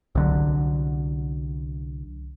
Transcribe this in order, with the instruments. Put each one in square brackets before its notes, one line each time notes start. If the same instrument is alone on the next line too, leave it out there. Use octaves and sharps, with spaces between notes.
[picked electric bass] C2 D3 F#3